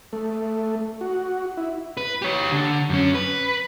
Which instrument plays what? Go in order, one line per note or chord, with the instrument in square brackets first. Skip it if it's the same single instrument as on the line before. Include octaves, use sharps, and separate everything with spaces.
[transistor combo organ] A3
F#4
E4
[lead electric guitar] B4
G4 C#5
D3
F#2 C#4
B4